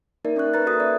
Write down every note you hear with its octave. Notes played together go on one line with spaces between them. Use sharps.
A#3 D#4 A#4 D5 E5
C#4 A#4 C#6 F#6
A#3 B4 A#5 F#6 A6
F#4 A4 E5 D#6
D5